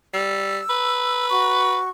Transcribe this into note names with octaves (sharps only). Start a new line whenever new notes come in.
G3 E6
B4
F#4 C#6